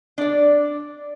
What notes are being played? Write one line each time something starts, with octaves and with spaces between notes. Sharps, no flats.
D4 D5